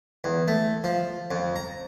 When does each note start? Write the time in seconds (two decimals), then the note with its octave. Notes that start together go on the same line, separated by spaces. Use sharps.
0.24 E2
0.48 A3
0.84 F3
1.31 F2
1.56 A#5